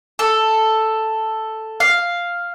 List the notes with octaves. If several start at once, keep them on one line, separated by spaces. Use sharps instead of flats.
A4
F5